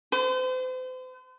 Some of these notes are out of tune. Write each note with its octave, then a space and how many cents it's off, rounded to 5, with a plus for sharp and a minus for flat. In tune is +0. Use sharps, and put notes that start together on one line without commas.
C5 -40